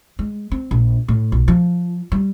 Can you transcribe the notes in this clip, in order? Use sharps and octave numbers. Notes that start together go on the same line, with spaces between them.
G#3
C4
A#1
A2
B1
F3
G3